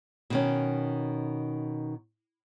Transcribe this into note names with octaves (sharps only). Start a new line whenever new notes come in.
B2 D#3 C#4